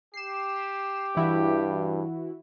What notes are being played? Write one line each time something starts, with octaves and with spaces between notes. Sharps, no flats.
G4 C7 E7
G2 E3 E4 F#4